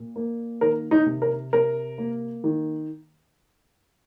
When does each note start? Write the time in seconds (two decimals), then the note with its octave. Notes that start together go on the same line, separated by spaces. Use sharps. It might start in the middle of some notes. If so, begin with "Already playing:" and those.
Already playing: A#2
0.16 A#3
0.61 D#3 A#4
0.91 D#4
1.06 C3
1.22 A#4
1.53 C3 A#4
1.98 A#3
2.44 D#3